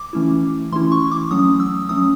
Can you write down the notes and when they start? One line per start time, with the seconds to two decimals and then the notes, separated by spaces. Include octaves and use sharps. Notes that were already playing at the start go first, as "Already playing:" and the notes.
Already playing: D6
0.13 E3 A3 C#4 E4
0.72 E3 A3 C#4 E4 C6
0.92 C#6
1.11 D6
1.31 F#3 A3 C#4 D#6
1.60 E6
1.89 F#3 A3 C#4 D#6